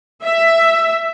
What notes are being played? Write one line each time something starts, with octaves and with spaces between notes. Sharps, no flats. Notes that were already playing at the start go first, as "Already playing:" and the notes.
E5